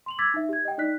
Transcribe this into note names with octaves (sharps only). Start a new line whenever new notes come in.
C6 F7 F#7
D6 E6 G#6 A6 B6
D#4 E5
G4 G#6
D#5 G5
D#4 D5 F#6 B6